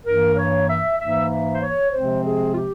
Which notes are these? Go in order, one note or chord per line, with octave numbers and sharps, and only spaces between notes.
G2 E3 A#3 A#4
C#5
E5
G#2 E3 A#3 E5
E5
C5
C#5
C3 F3 G#3 C4 C5
G#4
F4
G4